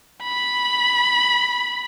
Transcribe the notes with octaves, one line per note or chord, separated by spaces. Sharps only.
B5